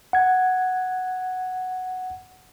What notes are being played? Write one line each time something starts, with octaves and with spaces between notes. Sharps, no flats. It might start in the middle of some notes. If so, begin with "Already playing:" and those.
F#5 G#6